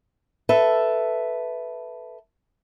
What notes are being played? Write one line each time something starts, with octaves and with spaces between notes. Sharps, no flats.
A4 B4 E5